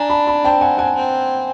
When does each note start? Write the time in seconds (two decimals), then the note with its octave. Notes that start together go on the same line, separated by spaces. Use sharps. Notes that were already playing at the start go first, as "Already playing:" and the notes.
Already playing: D4 G#5 A#5
0.10 A5 B5
0.27 A5 B5
0.44 C4 G5 A5
0.61 F#5 G#5
0.78 F#5 G#5
0.96 C4